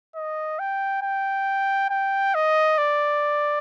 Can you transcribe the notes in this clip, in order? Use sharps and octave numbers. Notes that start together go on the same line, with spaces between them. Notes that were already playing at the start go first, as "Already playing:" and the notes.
D#5
G5
G5
G5
D#5
D5